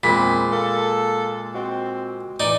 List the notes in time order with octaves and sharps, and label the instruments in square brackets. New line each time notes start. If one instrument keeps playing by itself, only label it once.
[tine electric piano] E2 C4 [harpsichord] A#2 [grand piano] G#3 B6 [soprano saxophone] B5
[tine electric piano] A#3 F5 [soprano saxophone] A4
[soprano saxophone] C4 [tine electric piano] F#4 D#5
[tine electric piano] A2 E3 [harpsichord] D#4 [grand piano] D5 [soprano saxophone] D6